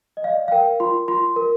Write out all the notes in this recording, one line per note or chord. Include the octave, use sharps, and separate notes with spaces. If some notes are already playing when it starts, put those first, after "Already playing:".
D#5
D5 F5
F5
A#4 G5
F4 C6
F4 C6
A#4